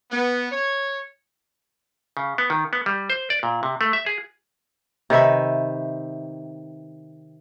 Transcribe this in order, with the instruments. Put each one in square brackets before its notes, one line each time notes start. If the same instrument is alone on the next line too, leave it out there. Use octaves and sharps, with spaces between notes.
[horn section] B3
C#5
[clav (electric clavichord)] C#3
B3
D#3
B3
G3
C5
D5
A#2
C3
A3
E5
G#4
[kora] C3 D#3 B4 E5